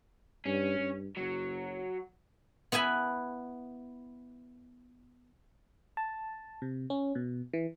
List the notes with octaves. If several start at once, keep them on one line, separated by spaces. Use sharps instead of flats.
G2 C#4
G2
F#1 F#3
B3 E4 B4 G#5 B5
A5
C3
C#4
B2
E3